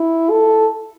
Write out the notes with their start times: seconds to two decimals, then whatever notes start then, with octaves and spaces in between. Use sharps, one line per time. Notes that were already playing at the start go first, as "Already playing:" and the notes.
Already playing: E4
0.30 A4